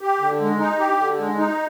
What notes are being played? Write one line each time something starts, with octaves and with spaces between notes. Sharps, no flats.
G4
D3
G#3
D#4
G4
D3
G#3
D#4